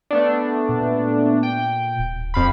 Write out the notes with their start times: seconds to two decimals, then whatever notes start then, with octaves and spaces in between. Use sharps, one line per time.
0.11 A3 B3 D4
0.69 A#2
1.43 G5
1.99 D1
2.34 F2 F5 B5